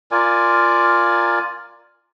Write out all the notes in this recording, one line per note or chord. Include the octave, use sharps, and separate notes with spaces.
F4 A#4 D5 G#5